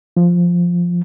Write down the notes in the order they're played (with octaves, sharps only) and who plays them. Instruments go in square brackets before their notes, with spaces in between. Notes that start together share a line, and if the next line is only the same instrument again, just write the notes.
[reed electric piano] F3